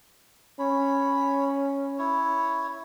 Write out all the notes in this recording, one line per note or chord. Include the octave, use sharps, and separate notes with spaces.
C#4 C#5 B5
E4 C#5